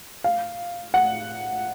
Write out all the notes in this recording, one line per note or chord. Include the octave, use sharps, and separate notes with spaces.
F5
F#5